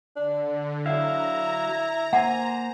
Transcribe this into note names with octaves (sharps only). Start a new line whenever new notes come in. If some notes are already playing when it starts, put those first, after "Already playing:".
D3 D4
F#3 E4 F5 A#5
A#3 C5 F#5 G#5